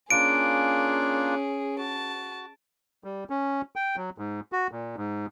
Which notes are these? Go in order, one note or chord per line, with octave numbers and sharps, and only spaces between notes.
A#3 C#4 D4 F4 G#4 D7
F#4 A5
G3
C#4
G5
F#3
G#2
F#4
A#2
G#2